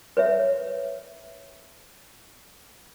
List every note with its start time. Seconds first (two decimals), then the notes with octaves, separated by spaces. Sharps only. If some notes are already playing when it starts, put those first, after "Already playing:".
0.17 B4 C#5 E5